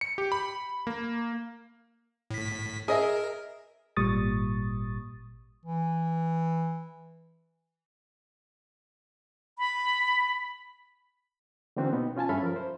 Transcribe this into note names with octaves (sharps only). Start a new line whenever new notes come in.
C#7
G4
B5
A#3
A2 B6
G#4 A#4 D#5 E5
G#1 A#2 G3 C#6 D#6 A6
E3
B5
D3 E3 A#3 C4 C#4 F#4
B2 B3 D#4
C#4 F4 G#5 A5
G2 C#4 A4 E5 B5 F6
F3 A#4
C5